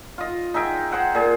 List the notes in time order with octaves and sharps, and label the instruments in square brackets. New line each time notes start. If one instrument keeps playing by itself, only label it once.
[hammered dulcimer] F4 D#5
D#4 G#4 E5 G5
G#4 C5 F#5 G5
A#2 G#4